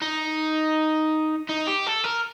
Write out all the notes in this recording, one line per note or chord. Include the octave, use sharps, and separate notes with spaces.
D#4
D#4
G4
A4
A#4